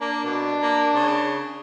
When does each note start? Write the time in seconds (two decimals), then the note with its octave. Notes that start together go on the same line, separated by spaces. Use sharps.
0.01 A#3 D4
0.25 B2
0.62 A#3
0.95 C#3